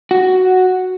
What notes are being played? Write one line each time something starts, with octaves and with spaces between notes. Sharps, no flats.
F#4